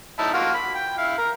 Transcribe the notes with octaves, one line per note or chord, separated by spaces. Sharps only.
D#4 E4 A5
A#3 F4 F#4
B5
G5
E4 F5
A#4